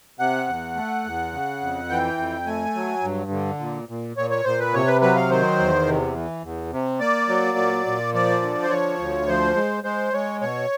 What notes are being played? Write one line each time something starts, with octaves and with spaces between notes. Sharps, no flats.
C3 F#5
E2
A3
E2
C#3
F2
E3 G5
F2
A3 G#5
F#3
G2
D3
A#2
A#2
A#2 C#5
C#5
A#2 C5
B4
C3 C#5
B4
F#3 B4
F5
D#3 C5
E2
C3
E3
E2
C3
A#3 D5
F#3
A#2
A#2
F3 D5
D3
C5
F3 C#5
D2
F3 C5
G#3
G#3 C5
G#3 C#5
B2 C#5